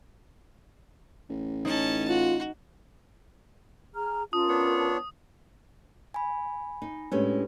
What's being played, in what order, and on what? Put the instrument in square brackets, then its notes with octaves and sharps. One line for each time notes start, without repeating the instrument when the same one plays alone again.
[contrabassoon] A1
[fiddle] C#4 A5 [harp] D#4
[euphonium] F4 [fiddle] F#4
[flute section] G#4 A#5 F6
[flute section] C#4 A#4 A5 [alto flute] F4 [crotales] D#6
[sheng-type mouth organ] B3 D4 C#5
[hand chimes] G#5 B5
[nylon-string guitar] D#4
[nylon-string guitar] A2 G#3 C#4 [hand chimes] D4 G4 B4